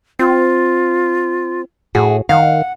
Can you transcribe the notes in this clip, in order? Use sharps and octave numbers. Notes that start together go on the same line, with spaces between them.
C4 F4
A2 F#4 G#4
D#3 F5 F#5